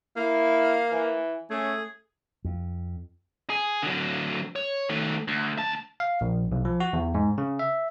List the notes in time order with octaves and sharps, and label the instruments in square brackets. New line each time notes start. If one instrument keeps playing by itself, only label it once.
[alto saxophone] A#3 [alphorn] E4 [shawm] F5
[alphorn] E3
[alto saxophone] A3 [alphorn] C#4 [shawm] G#4
[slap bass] F2
[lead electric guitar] G#4
D3 F#3
C#5
D#3 A3
D2
D2 A5
[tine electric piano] F5
A#1
B1
F3
F#4
E2
G#2
C#3
E5